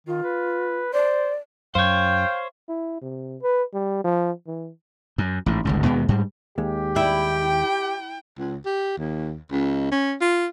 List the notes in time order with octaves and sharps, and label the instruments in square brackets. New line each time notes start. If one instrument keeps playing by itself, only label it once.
[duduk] D#3 [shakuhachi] F4
[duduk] B4
[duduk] C5 [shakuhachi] D5
[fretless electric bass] F#2 [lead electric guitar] C5 C#5 [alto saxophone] F5 [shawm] G5
[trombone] E4
C3
B4
G3
F3
E3
[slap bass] F#2
A1 G#2
G1 C#2 G#2
D#2 B2 G#3 B3
G#2 G3
[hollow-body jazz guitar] D#2 D#3 G#3 [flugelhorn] G4
[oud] E4 [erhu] G5
[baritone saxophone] C#2
G4
D#2
C#2
C#4
F4